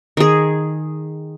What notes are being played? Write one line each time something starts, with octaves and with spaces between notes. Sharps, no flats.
D#3 G#4